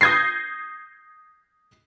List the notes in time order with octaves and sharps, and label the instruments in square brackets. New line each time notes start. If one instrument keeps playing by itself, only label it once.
[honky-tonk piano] D#6 G6 G#6 A#6 C7